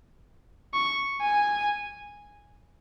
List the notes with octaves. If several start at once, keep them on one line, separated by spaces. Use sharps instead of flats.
C#6
G#5